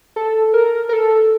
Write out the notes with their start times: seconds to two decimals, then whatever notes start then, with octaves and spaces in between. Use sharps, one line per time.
0.16 A4
0.54 A#4
0.89 A#4
0.93 A4